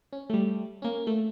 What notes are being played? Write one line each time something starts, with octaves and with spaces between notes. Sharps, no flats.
C#4
G3 A3
A#3 C#4
A3